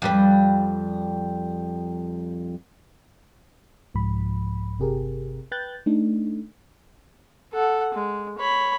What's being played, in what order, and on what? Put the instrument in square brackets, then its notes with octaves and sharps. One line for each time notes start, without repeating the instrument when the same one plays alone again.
[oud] F2 G3 B4
[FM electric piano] C2 G#2 F3 B5
G1 C3 G4 G#4 A#4
B4 G5 F#6 G6 A6
A3 D4 D#4
[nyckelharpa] A4 F#5
G#3
C#5 B5